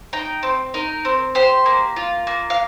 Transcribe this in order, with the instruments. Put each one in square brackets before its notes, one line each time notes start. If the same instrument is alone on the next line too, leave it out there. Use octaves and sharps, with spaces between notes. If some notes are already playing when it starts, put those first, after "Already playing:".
[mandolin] D#4 G5
C4
D#4 A#4
C4
G4 C5
A#3
F4
A#3
F5